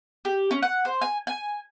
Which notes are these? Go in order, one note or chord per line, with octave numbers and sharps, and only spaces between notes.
G4
C#4
F#5
C5
G#5
G#5